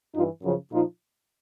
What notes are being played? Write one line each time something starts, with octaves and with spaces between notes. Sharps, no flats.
G2 E3 D#4 F4
F#2 C#3 F3
A#2 F3 D#4 F4